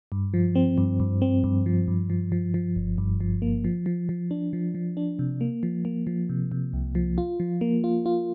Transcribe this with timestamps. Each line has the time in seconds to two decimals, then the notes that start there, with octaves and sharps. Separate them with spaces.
0.12 G2
0.34 F3
0.55 C4
0.78 G2
1.00 G2
1.22 C4
1.44 G2
1.66 F3
1.88 G2
2.10 F3
2.32 F3
2.54 F3
2.76 G1
2.98 G2
3.20 F3
3.42 A#3
3.64 F3
3.86 F3
4.09 F3
4.31 D4
4.53 F3
4.75 F3
4.97 D4
5.19 C3
5.41 A#3
5.63 F3
5.85 A#3
6.07 F3
6.29 C3
6.52 C3
6.73 C2
6.95 F3
7.18 F4
7.40 F3
7.61 A#3
7.84 F4
8.06 F4